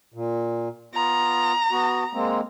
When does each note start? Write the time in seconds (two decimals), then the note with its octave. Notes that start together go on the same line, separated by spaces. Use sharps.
0.14 A#2
0.94 B3 F4 A#5
1.72 B3 F#4
2.14 G#3 A#3 C4